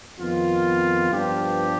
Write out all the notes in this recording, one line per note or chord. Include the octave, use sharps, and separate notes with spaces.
F2 D#3 B3 F4
G2 F3 B3 D4 G4